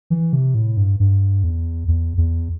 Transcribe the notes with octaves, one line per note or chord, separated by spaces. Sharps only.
E3
C3
A2
G2
G2
E2
E2
E2